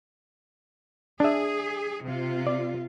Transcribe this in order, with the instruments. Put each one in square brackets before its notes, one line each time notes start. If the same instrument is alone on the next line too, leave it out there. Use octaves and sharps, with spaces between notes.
[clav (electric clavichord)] D4 E5 [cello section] G#4
[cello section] C3 F4
[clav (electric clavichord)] D5